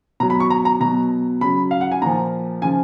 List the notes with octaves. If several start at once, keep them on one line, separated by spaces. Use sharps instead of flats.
B2 F#3 A#5
B5
C#6
A#5
A#5
B2 F#3 A#5
C#3 F#3 B5
F5
F#5
G#5
A#2 F3 A#5
C#3 F3 G#5